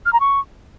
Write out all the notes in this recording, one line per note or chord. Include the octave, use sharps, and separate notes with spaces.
F6
A#5
C#6